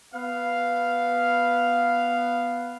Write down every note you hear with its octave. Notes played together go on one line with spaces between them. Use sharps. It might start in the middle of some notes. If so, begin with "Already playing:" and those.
B3 F5